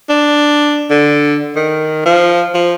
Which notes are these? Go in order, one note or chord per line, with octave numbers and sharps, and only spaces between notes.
D4
D3
D#3
F3
F3